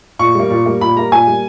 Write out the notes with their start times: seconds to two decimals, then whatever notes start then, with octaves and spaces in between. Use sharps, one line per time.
0.19 A#2 C#6
0.35 G3 A#3
0.51 A#2
0.66 G3 A#3
0.81 A#2 B5
0.96 G3 A#3 A#5
1.12 A#2 G#5
1.27 G3 A#3